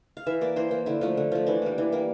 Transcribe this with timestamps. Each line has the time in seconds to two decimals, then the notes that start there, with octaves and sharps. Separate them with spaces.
0.17 F5
0.26 E3 E5
0.41 A#3 D5
0.56 E3 C5
0.71 A#3
0.86 D3 E4
1.01 F3 A3
1.17 D3
1.32 F3 A3
1.46 E3 D4
1.62 G3 A#3
1.78 E3
1.92 G3 A#3